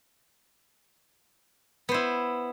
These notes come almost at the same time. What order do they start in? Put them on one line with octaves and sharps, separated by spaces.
B3 C5 E4